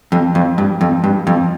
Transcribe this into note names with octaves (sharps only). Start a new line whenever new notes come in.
F2
F2
G2
F2
G2
F2